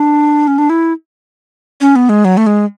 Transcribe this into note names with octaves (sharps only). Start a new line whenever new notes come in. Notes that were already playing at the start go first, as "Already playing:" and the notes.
Already playing: D4
C#4
D4
E4
C#4
B3
G#3
F#3
A3
G#3